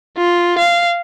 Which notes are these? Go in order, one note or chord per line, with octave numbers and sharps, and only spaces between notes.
F4
F5